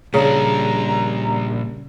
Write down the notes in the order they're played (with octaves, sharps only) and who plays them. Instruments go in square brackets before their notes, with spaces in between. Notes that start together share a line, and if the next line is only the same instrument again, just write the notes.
[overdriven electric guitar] A#2 D4 [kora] C#3 [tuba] G3 [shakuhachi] A#5